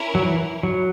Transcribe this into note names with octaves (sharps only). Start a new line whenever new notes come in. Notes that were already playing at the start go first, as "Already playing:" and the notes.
Already playing: C#4 E4 A#4 C#5
F#3
E3
F#3